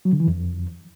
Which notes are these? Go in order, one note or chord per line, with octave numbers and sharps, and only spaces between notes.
F#3
D3
E3
F2